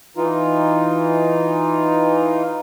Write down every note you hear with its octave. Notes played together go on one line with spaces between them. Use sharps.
E3 D#4 F4